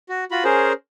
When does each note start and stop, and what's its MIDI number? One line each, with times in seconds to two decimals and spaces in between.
0.09 0.25 66
0.31 0.44 65
0.31 0.44 66
0.31 0.44 83
0.44 0.73 61
0.44 0.73 68
0.44 0.73 70
0.44 0.73 72